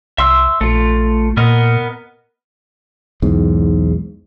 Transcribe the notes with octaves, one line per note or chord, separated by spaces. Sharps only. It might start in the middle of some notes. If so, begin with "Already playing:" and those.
C2 E5 C6 E6
A#1 A3 F4
A#2 B3 A#4 D#5
B1 E2 G#2